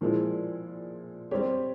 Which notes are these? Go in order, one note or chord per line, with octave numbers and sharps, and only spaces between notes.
A#2 F3 G#3 E4
G3 C4 G4 C#5